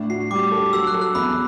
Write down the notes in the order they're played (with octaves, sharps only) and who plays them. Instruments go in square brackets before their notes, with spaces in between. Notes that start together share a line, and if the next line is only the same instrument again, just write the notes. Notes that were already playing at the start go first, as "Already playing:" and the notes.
Already playing: [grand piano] A2 D4
[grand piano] F#4 [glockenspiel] C7
[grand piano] G3 [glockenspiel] D6
[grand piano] A4
[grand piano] F#3 [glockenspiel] E6
[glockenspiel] F#6
[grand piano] A4
[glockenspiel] F#6
[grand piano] E2 [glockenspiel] B5